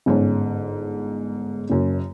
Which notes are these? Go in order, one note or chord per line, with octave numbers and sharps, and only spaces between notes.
G1 G#2 C#4
F#1 F#2